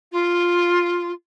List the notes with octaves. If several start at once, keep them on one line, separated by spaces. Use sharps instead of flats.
F4